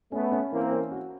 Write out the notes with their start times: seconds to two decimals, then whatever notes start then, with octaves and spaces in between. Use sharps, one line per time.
0.12 A3 B3 C#4
0.32 C#4
0.51 E3 A#3 C4
0.72 C#4
0.92 F#4